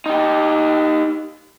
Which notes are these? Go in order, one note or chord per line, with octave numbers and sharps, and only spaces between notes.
D#4 G4